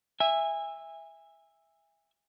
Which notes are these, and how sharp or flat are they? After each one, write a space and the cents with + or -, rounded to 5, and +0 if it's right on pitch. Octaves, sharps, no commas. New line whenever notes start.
E5 +0 G#5 -25